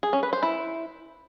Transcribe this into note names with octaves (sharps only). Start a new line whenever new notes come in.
G#4
C#4
B4
C5
E4